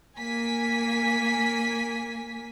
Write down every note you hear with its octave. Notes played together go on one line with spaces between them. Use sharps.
A#3 G#5 B6